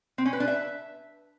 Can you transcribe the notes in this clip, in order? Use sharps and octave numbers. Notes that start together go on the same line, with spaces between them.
C4
C#4
B4
D4
E5